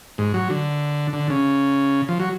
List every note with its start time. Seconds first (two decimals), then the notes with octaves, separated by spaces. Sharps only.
0.18 G#2
0.34 F#3
0.50 D3
1.13 D3
1.30 C#3
2.09 F3
2.20 F#3